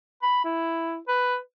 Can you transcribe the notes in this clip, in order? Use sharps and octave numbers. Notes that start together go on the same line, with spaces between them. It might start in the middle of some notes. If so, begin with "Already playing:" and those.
B5
E4
B4